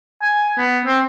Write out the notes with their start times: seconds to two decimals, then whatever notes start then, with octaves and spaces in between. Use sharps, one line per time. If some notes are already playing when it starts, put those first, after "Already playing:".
0.21 G#5
0.58 B3
0.86 C4